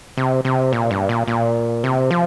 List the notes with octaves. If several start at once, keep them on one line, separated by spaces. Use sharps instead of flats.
C3
C3
A#2
G2
A#2
A#2
C3
F3